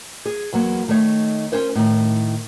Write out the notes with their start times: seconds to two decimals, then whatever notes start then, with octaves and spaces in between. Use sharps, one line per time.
0.26 G#4
0.53 E2 F#3 A#3
0.88 D#3 A3 D#4 C#5
1.52 C#4 F4 A#4 C5 C#5
1.75 A2 D#3